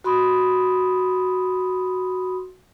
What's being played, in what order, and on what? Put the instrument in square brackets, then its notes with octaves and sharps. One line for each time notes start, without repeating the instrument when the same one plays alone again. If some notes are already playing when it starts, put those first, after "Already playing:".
[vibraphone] F#4 B5 C6 D#6